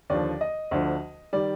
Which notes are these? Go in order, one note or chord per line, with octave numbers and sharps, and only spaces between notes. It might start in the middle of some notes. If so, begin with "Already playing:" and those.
D#2 D3 F3 D5
D#5
D2 D3 F3
D#3 G3 D5